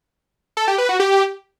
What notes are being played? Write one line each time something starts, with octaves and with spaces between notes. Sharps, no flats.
A4
G4
B4
F#4
G4